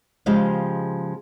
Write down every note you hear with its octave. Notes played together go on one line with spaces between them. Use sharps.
C#3 F3 G#3 G4 D#5 F5